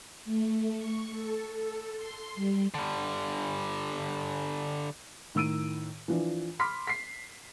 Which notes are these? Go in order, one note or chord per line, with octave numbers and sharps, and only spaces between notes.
A3
C#6
A4
A4
C6
G3
D3 G3
A2 D#3 E6 D7 D#7
E3 F3 D4
B5 C6 D6 F6 B6
B6 C7